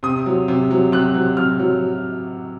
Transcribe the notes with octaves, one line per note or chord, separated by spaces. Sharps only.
C3 D#6
F#3
C3
F#3
C3 F#6
F#3
C3 F6
F#3